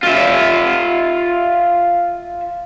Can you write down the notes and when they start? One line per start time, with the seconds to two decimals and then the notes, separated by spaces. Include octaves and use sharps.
0.04 F4 E5